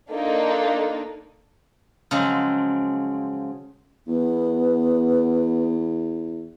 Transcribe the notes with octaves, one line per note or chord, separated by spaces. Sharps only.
A#3 D4 D#4 F4 A4
C#3 F3 F#3 G#3 C4
E2 B3